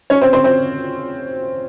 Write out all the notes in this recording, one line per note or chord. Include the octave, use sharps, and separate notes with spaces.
C#4 C#5
C4 C5
C4 C5
C4 C5